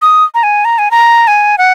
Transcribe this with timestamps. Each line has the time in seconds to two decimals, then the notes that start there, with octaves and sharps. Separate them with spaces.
0.02 D#6
0.35 A#5
0.43 G#5
0.65 A#5
0.78 G#5
0.91 A#5
1.27 G#5
1.58 F#5